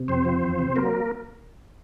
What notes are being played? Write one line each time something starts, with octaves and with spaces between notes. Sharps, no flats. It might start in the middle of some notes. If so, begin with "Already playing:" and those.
Already playing: C3
F2 C4 C5
F3
E2
C3
F#3 A#3 A#4